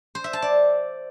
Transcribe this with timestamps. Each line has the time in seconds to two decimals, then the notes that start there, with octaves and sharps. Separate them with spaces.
0.15 C5
0.24 E5
0.33 A5
0.42 D5